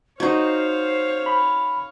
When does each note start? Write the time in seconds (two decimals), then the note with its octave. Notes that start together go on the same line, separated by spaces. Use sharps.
0.20 D#4 F#4 C5 C#5 F5
1.26 B5